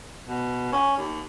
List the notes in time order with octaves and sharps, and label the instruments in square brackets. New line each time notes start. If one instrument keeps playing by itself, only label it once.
[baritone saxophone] B2
C#4
D#2